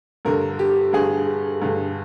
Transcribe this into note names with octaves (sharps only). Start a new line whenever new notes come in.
G2 D3 A#4
G4
G2 D3 G#4
G2 D3